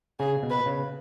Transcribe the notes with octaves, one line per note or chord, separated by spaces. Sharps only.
C#3 G#4
B2
B4
C#3